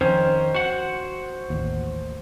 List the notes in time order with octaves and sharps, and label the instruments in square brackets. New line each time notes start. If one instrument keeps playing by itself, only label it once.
[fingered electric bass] F2 [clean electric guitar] D#3 C#4 [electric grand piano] C5
[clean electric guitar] F#4 F#5
[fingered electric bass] A1 D#2